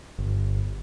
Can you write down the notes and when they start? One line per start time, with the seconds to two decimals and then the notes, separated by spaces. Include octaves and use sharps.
0.18 G1